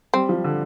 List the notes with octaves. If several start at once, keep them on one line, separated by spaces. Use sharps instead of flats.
G3 C4
F3
D3